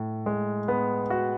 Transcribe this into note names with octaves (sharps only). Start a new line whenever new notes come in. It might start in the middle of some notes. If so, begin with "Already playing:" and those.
Already playing: A2
G#3
B3
F#4